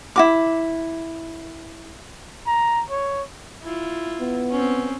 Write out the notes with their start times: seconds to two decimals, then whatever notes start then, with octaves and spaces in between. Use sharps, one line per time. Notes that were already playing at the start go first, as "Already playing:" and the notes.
0.16 E4 F#4 D6
2.47 A#5
2.90 C#5
3.62 E4 F4
4.20 B3
4.50 C4 C#4